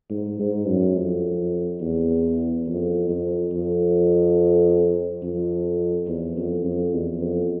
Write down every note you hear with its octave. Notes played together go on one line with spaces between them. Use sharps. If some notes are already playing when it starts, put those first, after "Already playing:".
G#2
G#2
F#2
F2
E2
F2
F2
F2
F2
E2
F2
F2
E2
F2